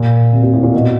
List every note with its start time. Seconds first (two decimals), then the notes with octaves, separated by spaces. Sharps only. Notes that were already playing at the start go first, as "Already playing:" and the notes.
Already playing: A#2
0.33 C3
0.43 A#2
0.53 A2
0.63 A#2
0.74 B2